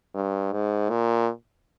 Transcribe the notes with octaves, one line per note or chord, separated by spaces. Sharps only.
G2
G#2
A#2